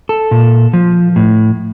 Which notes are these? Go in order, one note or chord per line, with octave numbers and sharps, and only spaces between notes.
A4
A#2
F3
A2